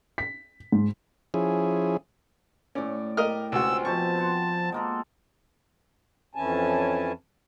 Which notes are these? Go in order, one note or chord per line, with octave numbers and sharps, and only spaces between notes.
B6
G#2
F3 C#4 E4 G#4
A2 C#4 D5
G4 A#4 D#5 F6
C#2 C3 F4 F#4 G#5 E6
B2 F3 C4 B4 A5 C#6
F#5 C6
G#3 A#3 A4
F2 E3 C#4 E4 G#5 A5